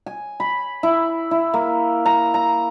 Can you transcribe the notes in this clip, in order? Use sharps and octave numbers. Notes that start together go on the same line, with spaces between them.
G#5
B5
E4
E4
A#3
A#5
A#5